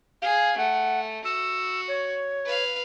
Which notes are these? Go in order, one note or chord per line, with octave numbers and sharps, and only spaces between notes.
G#4 F5
A3 F#5
F#4 E6
C#5
B4 F5